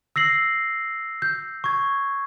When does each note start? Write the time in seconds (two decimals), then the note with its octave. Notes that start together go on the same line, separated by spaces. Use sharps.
0.16 E6 A#6 C7 F#7
1.22 G6
1.64 C#6 G#6